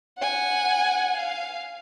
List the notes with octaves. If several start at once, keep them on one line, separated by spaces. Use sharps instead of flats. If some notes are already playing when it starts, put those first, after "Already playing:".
F#5 G#5
F5